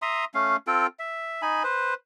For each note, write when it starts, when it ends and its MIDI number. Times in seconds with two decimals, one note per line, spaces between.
0.02 0.25 76
0.02 0.25 82
0.02 0.25 84
0.02 0.25 87
0.34 0.56 57
0.34 0.56 61
0.34 0.56 77
0.67 0.87 60
0.67 0.87 65
0.67 0.87 69
0.67 0.87 79
0.99 1.42 76
1.42 1.63 63
1.42 1.63 80
1.42 1.63 83
1.64 1.94 71
1.64 1.94 72